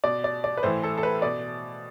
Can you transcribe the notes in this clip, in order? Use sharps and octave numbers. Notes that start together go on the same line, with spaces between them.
B2 D5
D5
D5
B4
A2 E3 C5
A4
A4
B4
B2 D5